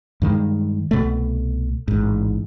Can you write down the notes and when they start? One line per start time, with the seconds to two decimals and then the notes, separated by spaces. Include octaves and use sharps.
0.22 G2 D#3 G#3
0.91 C2 B2 A3
1.88 A1 G#2